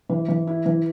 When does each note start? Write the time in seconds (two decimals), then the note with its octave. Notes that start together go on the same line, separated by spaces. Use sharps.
0.09 E3
0.28 E3
0.47 E4
0.66 E3